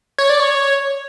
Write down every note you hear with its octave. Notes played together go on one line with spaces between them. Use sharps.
C#5
D5
C#5